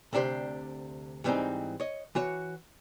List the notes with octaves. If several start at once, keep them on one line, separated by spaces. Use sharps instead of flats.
D2 C3 D4 G4 C5
G#2 E3 G3 A#3 C4 D#4
C#5 D#5
E3 F#4 C#5